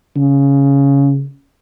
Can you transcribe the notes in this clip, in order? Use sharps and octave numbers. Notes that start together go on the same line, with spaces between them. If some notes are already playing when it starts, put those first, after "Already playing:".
C#3